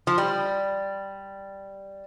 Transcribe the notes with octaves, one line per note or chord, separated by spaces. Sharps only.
F3
G3